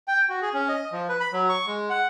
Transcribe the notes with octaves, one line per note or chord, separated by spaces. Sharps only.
G5
F#4
G#4
C#4
D#5
F3
B4
B5
F#3
C#6
G#3
F#5